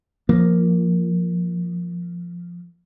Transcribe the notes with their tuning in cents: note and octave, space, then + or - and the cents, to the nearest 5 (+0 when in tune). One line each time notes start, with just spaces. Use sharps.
F3 +0 A#3 +0